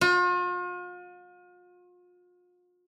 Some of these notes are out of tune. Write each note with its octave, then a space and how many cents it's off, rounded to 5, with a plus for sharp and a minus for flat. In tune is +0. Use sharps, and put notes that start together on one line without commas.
F4 +40